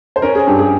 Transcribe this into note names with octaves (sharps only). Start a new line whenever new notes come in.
C5
C#4 A#4
G#4
G2 G4
G#4